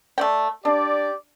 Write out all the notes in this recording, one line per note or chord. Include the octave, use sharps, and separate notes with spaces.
A3 D5 G5
D4 G4 D5